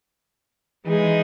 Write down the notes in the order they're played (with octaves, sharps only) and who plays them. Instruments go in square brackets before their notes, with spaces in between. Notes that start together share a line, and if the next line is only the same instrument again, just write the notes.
[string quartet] E3 G#3 D#4 G#4